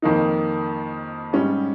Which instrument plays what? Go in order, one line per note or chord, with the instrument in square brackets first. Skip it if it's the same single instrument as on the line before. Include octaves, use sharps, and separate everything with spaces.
[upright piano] F2 D#3 A#3 D#4
G#2 G3 C#4